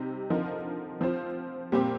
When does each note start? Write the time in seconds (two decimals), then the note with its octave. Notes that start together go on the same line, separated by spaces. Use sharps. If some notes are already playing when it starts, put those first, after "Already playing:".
Already playing: C3 G3 C4 D#4
0.30 D3 F3 C4 D#4 A#4
1.01 F3 C4 F4 C5
1.72 A#2 G3 C4 G4